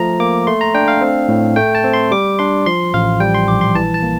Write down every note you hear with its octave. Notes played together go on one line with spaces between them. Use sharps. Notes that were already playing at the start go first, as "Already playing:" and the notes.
Already playing: F3 A3 A#5
A#3 D6
A3 C6
A#5
D4 G5
F5
C4
A2
A3 G5
A5
C4
C6
G3 D6
D4 C6
F3 C6
A1 F5
G3 G5
C6
A#1 D6
C6
E3 A5
A5
A#3